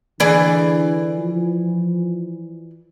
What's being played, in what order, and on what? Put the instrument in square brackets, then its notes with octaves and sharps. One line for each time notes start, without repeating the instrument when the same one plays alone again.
[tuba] D3 [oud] E3 G#4 D5
[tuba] F3